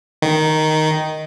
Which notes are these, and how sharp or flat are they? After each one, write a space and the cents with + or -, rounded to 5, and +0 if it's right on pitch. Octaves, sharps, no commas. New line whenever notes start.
D#3 +0